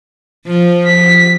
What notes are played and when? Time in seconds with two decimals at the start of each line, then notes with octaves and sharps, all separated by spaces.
0.46 F3
0.86 B6